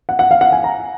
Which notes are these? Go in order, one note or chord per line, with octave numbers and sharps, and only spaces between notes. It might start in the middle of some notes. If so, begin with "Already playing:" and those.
F#5
F#5
F5
F#5
G#5
A#5